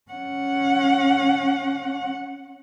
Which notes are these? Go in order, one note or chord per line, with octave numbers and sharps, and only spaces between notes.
C#4 F#5